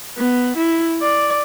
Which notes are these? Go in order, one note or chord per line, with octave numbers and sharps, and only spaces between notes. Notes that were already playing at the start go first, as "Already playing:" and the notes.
B3
E4
D5